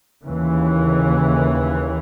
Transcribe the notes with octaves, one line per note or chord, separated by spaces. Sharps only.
D#2 C#3 E3